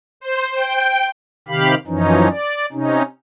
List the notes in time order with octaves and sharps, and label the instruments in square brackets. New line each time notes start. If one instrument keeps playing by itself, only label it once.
[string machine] C5
G5
[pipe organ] C3 D#3 G4 F5 B5
F#2 E3 F3 C#4 D#4
D5
C3 C#4 D#4